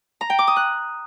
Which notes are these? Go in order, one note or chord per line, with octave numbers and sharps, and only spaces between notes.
A#5
G5
D6
D#6
F#6